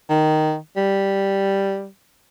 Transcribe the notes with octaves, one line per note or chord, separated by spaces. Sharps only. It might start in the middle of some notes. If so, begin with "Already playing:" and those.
D#3
G3